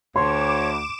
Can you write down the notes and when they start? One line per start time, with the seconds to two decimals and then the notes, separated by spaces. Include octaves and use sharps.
0.16 D2 C#5 C6 D6 E7